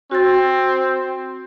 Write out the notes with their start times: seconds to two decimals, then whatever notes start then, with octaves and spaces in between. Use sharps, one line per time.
0.11 C4 F#4 A6